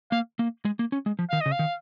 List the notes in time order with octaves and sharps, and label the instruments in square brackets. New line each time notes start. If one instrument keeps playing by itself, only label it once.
[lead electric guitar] A#3 [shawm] F5
[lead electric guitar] A#3
G#3
A#3
C#4
G#3
F3
[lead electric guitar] D#3 [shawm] F5
[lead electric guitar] C#3 [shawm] D#5
[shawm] F5
[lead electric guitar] D#3